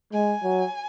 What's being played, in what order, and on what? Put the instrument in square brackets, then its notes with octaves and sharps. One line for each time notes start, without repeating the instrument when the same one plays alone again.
[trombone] G#3 [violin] G#5
[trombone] F#3